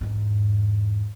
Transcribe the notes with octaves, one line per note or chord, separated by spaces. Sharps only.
E2 G#2